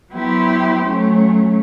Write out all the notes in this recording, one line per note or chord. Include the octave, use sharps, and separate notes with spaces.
F#3 B3 E4 G4 C5
F#3 A3 C#4